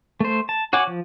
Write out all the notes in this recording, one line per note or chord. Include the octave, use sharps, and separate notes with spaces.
A3 C5
A5
F#4 C#5 F#5 G#5 D6
F3